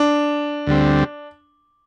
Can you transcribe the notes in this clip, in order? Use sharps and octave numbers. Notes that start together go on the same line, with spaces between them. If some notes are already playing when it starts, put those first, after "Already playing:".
Already playing: D4
D2 D3 G3 C4